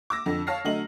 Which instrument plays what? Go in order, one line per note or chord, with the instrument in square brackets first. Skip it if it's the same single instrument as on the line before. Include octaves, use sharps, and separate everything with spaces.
[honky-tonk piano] D6 E6 A#6
F2 D3 A4
C#5 F5 A5 F6 A#6 C7
D3 F#3 A3 D#5 F#7